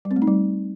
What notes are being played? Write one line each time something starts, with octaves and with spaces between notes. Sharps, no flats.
G3
C4
A3
D#4
G3